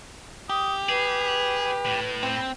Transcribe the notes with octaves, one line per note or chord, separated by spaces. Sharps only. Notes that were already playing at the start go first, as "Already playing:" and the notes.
G4 D#6
G#4 B4
A2
C4